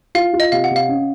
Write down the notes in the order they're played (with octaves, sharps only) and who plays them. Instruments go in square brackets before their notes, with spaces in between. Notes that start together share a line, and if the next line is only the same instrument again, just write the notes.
[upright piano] F4 [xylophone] F5
[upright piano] F4
[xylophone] D#5
[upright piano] C3 [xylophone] F5
[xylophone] F#5
[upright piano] C3
[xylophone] F5
[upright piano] C#4